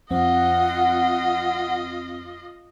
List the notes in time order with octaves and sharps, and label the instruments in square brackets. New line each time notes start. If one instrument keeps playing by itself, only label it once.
[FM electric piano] F2 C4 [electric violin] F4 D#5 [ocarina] F#5